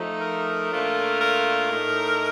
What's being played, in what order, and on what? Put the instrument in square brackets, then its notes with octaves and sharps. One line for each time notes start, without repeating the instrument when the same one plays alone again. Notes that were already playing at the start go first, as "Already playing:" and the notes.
Already playing: [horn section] F3 A3 D#4
[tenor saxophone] A#4
[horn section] A#2 A3 D4 F4
[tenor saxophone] A#4
[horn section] A2 A3 D#4